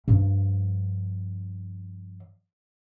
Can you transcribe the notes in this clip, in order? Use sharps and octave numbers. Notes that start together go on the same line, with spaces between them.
G2 F3